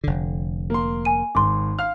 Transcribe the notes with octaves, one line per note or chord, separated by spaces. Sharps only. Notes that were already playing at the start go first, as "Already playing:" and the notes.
F1 D3
A#3 C6
G#5 D#7
G#1 C6 D6
F5 F6